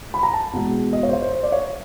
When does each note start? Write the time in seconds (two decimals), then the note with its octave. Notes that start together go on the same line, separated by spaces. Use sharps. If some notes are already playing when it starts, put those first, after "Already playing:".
0.14 B5
0.23 A#5
0.34 A5
0.53 E2 B2 G#3
0.93 D#5
1.03 C#5
1.09 C5
1.13 C#5
1.22 C5
1.33 C5
1.43 D5
1.52 C#5